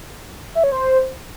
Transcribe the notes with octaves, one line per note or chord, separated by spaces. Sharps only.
E5
C#5
C5